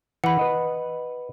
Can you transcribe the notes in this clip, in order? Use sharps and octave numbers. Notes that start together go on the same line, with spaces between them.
E3 F#5 B5
B4 D#5